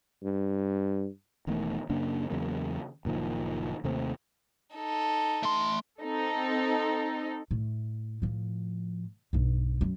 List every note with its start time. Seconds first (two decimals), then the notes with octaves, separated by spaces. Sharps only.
0.23 G2
1.47 E1 E2 D#3 A3
1.90 F#2 C#3 A#3 D4
2.30 E2 C#3 F#3 A#3
3.05 F#1 A#2 D#3 F3
3.84 D#2 C3 A3 C4
4.75 D#4 A4
5.43 A3 C6
6.01 C4 D#4 A4
7.51 A2 A3
8.22 A2 F3
9.33 B1 G2
9.81 F#2